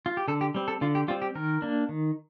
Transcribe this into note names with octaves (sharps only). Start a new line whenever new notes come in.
F4
G4
D3 A4
G4
G3 C4
A4
D3 F4
G4
G3 C4 F4
G4
D#3 A#4
A#3 D4
D#3